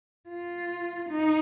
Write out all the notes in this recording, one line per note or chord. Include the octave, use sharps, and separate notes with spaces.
F4
D#4